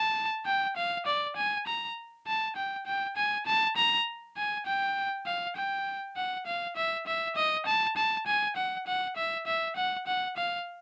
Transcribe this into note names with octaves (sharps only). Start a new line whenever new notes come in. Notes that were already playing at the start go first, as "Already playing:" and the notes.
Already playing: A5
G5
F5
D5
G#5
A#5
A5
G5
G5
G#5
A5
A#5
G#5
G5
F5
G5
F#5
F5
E5
E5
D#5
A5
A5
G#5
F#5
F#5
E5
E5
F#5
F#5
F5